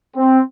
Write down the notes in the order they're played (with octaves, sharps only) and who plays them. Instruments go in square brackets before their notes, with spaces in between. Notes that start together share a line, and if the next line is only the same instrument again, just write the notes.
[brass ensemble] C4